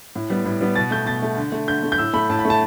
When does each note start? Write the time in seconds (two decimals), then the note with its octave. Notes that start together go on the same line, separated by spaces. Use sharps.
0.16 A2
0.30 G3 B3
0.45 A2
0.61 G3 B3
0.76 B2 A6
0.91 A3 G6
1.06 B2 A6
1.22 A3
1.37 D3
1.52 A3
1.68 D3 G6
1.83 A3
1.92 G6
1.98 A2 E6
2.13 A3 B5
2.30 A2 A5
2.39 B5
2.45 A3
2.50 A5